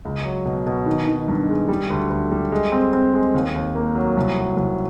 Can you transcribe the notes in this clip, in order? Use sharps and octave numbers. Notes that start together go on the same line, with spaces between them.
C#2
F#3
B2
B2
D#3
D#3
G2
G#3
G3
D2
D2
G3
G#3
C4
C4
G#3
D#2
D#2
A#3
F#3
C2
F#3
C2